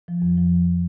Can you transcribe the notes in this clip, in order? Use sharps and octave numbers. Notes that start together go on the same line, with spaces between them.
F3
F2
F3